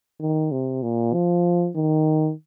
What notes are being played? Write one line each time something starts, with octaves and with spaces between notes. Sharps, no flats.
D#3
C3
A#2
F3
D#3